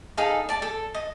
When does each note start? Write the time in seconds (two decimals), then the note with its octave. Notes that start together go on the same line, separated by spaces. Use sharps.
0.17 D#4 G#4 A4 F5
0.49 D5 A5
0.62 A4
0.94 D#5